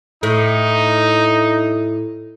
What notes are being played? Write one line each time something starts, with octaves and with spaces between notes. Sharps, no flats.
A2 D#4